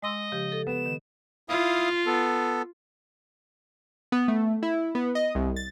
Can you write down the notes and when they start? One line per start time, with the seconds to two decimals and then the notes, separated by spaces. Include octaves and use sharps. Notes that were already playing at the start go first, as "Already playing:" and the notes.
0.03 G#3 D#5 C6 E6
0.32 C#3 F3 G4
0.52 A4
0.67 B3 E7
0.86 D#3
1.49 E4 F4 F5 D#6
2.06 B3 A4
4.12 B3
4.28 A3
4.63 E4
4.95 B3
5.15 D#5
5.35 C2
5.56 A6